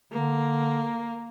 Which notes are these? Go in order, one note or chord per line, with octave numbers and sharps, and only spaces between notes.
D3 A#3